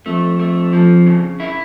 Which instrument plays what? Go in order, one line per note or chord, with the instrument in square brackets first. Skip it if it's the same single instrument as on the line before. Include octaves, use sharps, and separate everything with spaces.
[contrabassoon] F2 [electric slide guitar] A3
[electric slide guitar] A3
F3
C#3
E4